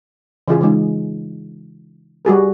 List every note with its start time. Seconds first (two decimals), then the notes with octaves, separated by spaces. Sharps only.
0.48 C#3 E3 F4 G#4
0.61 C#3 E3 G#3 D#4
2.25 G3 F#4 G#4 A#4